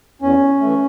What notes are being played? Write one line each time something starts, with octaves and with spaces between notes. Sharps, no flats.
E2 C#4
E3 A3